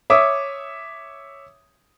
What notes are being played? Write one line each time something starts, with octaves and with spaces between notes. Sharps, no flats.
C#5 E5 D6 D#6